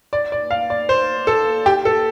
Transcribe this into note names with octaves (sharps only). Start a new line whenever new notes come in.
D5
D5
F5
D5
C5
A4
G4
A4